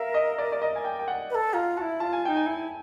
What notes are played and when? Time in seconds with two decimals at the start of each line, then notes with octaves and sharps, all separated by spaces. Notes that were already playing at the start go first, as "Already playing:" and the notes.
Already playing: A#4 E5 F5
0.14 D#5
0.38 D5
0.52 D5
0.62 D#5
0.76 G#5
0.84 G5
0.99 G5
1.08 F#5
1.30 B4
1.35 A4
1.54 F4 A#5
1.77 E4 F#4 A5
2.00 F4 A5
2.13 G#5
2.24 D#4 F4 G5
2.37 G#5
2.46 E4